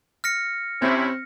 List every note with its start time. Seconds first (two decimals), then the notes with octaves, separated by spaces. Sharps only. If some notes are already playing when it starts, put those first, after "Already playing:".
0.24 F6 A#6 C#7
0.82 C3 C4 C#4 E4